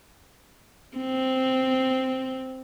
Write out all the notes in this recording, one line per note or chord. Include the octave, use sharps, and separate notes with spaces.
C4